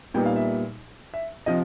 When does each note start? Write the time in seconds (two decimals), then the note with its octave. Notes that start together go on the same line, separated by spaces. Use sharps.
0.14 A#2 G3 B3 D#4 G5
0.25 F5
0.36 E5
1.14 E5
1.46 C3 F3 D#5